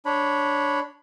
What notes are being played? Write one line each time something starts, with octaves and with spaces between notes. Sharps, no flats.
D4 C#5 B5